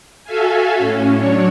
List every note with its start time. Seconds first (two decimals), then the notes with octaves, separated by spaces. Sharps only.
0.24 F#4 A4 E5 F5 G#5
0.77 A2 C#4
1.16 F#3 D4 C#5